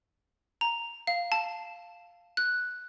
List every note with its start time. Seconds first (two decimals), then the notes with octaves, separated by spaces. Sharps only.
0.61 A#5
1.07 F5
1.32 A5
2.37 F#6